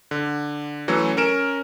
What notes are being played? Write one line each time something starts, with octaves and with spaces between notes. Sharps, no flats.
D3
E3 F#3 A3 C#4
C#4 A#4 D7 E7